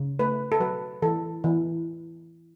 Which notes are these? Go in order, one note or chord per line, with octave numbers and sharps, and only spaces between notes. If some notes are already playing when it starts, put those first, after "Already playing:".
Already playing: C#3
A3 B4
A4
F#3 B4
E3 A4
E3